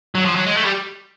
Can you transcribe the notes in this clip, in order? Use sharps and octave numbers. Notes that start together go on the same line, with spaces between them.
F#3
F3
F#3
G#3
A3
G3